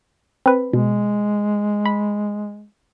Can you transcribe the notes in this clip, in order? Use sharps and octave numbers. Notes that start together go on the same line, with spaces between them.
C4 B4
B2 G#3
B5